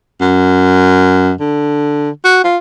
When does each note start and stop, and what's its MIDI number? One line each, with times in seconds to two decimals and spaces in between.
0.21 1.32 42
1.40 2.10 50
2.25 2.39 66
2.44 2.57 65